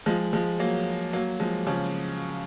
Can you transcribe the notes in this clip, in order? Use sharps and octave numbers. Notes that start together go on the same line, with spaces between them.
F3 G#3
F3 G#3
F#3 A#3
F#3 A#3
F3 G#3
C#3 F3